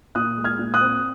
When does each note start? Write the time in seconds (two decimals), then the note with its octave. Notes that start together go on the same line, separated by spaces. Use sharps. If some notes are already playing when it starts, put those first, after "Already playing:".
0.15 A#2 D#6 F#6
0.37 G#3
0.44 F6 G#6
0.59 A#2
0.74 D#6 F#6
0.81 C4